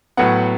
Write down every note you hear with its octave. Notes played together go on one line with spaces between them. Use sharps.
A2 F#3 B3 F#5